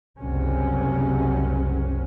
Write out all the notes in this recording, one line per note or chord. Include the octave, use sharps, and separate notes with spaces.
F#1 C2 C3 F#3 C#4